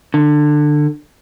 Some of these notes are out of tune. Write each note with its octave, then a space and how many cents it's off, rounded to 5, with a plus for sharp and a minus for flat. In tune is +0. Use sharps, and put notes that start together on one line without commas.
D3 +20